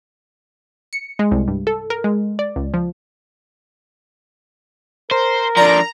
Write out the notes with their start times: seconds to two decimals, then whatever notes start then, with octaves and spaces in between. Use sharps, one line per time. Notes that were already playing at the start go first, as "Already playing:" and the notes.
0.93 C#7
1.19 G#3
1.31 C2
1.48 G2
1.67 A4
1.90 A#4
2.04 G#3
2.39 D5
2.56 C#2
2.74 F3
5.11 A#4 C5
5.57 D3 F3 D5 A#5